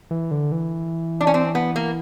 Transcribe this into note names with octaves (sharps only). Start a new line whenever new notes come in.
E3
D3
E3
D4
C#4
C4
B3
A#3